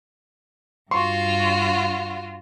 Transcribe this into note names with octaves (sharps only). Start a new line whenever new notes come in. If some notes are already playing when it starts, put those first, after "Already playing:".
G2 F4 F#4 C6 C#6